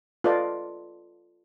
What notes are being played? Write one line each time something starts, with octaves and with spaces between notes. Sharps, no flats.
F4 A4 B4 D5 D#5